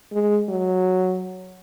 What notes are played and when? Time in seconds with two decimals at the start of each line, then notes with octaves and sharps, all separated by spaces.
0.13 G#3
0.49 F#3